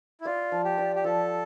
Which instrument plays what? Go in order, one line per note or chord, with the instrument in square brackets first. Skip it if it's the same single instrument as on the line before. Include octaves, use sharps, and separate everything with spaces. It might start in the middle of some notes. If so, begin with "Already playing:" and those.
[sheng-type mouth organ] E4
[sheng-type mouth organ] F4 [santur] D5
[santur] F3
[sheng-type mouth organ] G4
[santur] D5
[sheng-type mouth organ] G4
[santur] F3 [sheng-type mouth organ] A4